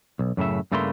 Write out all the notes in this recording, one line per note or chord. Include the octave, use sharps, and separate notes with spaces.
B1
F#2 A2 C#3 E5
G2 C#3 A3 A#3 E4 C6